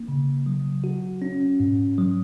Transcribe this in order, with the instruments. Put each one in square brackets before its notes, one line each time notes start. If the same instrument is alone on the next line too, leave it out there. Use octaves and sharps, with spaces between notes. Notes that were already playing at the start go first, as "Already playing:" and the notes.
Already playing: [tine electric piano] A#3
C#3
F#3
F#4
C#4
G#2
F#3